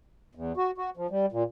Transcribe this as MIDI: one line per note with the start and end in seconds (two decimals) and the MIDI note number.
0.35 0.52 40
0.57 0.71 66
0.78 0.90 66
0.97 1.07 53
1.10 1.26 55
1.32 1.43 46